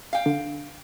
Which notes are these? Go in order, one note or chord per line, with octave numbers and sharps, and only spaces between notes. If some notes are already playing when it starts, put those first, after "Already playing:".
F5 G5
D3